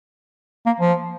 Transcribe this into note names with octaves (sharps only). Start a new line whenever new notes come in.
A#3
F3